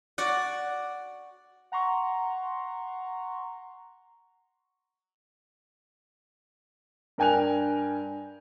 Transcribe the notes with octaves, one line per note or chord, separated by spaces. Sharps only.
F#4 D5 F#5
F#5 A#5 C6 C#6
G2 A#4 G5 G#5 F#6 F7